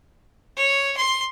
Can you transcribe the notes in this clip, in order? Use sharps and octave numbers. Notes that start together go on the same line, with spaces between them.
C#5
C6